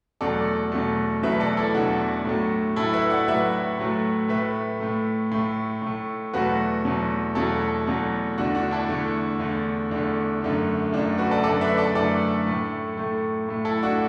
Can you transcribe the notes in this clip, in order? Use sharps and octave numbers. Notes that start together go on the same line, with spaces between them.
E2 B2 F#3 A3 A4 D5
E2 B2 F#3 A3
E2 B2 F#3 A3 B4 E5
A4 D5
E4 A4
E2 B2 F#3 A3 D4 F#4
A2 F#3 A3
A2 F#3 A3 E4 A4
B4 E5
D5 F#5
A2 F#3 A3 B4 E5
A2 F#3 A3
A2 A3 B4 E5
A2 A3
A2 A3
A2 A3
E2 B2 F#3 A3 F#4 B4
E2 B2 F#3 A3
E2 B2 F#3 A3 E4 A4
E2 B2 F#3 A3
E2 D3 A3 D4 F#4
D4 F#4
E4 A4
E2 D3 A3
E2 D3 A3
E2 D3 A3 D4
F#2 D3 A3
F#2 D3 A3 D4
F#4 B4
A4 D5
F#2 D3 A3 A4 D5
B4 E5
A4 D5
F#2 D3 A3 A4 D5
A2 A3
A2 A3
A2 A3
E4 A4
D4 F#4